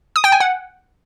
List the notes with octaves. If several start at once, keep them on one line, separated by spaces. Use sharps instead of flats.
D#6
G5
G#5
F#5